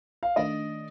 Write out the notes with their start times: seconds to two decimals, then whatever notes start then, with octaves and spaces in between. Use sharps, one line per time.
0.23 F5
0.36 D#3 A3 D4 D#5